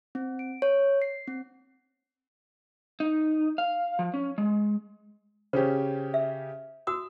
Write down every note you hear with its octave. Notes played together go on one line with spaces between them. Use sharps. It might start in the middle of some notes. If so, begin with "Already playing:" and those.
C4
D7
C#5
C7
C4
D#4
F5
F3
C#4
G#3
C#3 C#4 G4 C5
E5
F#4 D#6 E6